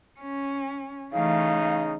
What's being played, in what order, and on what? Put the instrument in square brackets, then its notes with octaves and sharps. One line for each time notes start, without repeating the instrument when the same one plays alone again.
[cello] C#4
[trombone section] C#3 D#4 [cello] E3 A3 [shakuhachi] F5